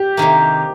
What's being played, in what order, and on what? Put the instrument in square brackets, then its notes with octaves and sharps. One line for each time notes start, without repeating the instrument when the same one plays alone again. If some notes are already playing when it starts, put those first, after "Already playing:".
Already playing: [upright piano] G4
[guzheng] C3 D#3 A#3